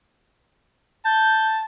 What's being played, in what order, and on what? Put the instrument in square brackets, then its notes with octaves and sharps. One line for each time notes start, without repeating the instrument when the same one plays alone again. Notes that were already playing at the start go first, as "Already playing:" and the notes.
[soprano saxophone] A5 [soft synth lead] G6